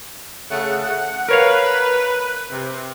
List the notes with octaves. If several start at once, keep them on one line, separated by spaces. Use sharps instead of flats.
C#3 A3 F#5
F#5
A#4 B4 C#5 F5
C3